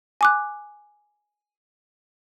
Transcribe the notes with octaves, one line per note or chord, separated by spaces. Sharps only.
G#5 D6 F#6